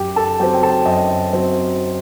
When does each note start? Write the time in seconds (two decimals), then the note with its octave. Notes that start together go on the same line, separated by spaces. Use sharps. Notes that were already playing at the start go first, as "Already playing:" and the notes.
Already playing: F#2 G4 G5
0.16 A4 A5
0.40 F#3 C4 G4 G5
0.54 G5
0.62 A4 A5
0.86 F#2 D#5
1.33 F#3 C4